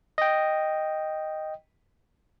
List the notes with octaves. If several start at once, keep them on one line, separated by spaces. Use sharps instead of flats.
D#5 G5